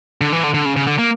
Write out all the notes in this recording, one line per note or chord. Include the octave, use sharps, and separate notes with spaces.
D3
E3
D3
D3
C#3
C#3
D3
A#3